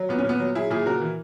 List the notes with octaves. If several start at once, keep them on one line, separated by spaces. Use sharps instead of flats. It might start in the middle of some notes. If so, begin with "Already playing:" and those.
Already playing: F#3
A#2 B3
C#4
A#2 B3
F#3
F#3 E4 G#4
A#2 E4 G#4
C#3 F#4 A#4
E3